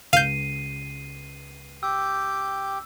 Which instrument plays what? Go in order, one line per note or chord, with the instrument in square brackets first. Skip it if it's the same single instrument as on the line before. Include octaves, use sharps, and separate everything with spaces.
[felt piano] C#2 [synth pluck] F5 G6 [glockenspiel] C7 D#7
[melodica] G4 G5 [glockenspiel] E6